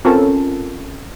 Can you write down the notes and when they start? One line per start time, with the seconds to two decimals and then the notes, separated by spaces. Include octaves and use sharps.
0.05 C4 C#4 F4 A4 A#4 A5